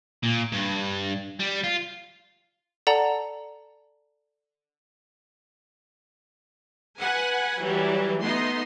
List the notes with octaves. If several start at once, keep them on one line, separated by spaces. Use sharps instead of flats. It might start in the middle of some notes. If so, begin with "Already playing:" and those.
A#2
G2
G3
F4
A4 D5 F#5 A5 A#5
B4 F#5 G#5
E3 F#3 G3
A3 B3 D#4 D#5 C6